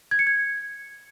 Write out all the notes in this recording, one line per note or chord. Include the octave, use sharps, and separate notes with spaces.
G#6
C#7
G#6